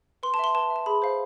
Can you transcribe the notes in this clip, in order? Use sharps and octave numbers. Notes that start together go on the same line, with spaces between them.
B4 C6
A5
E5 C6
B4 A5
E5
A5
G#4 B5
C5 F5